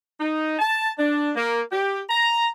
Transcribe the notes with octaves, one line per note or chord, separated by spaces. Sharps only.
D#4
A5
D4
A#3
G4
A#5